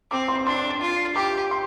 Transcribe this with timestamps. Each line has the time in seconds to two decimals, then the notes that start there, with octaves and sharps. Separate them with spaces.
0.11 C4 D6
0.28 C6
0.46 D4 C6
0.81 F4
1.15 G4 D6
1.51 C6